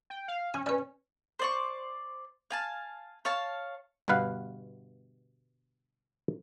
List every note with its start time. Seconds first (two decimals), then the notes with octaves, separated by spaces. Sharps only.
0.10 G5
0.28 F5
0.54 C#4 G#5
0.66 C#4 B4 D5
1.39 C5 D5 C#6
2.50 F5 G#5 A5
3.25 C#5 F5 A5
4.08 G1 G2 B2 B4 F5 F#5